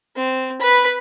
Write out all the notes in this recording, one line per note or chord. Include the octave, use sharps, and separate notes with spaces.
C4
B4 B5